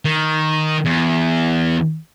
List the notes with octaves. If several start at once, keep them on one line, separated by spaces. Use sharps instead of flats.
D#3
E2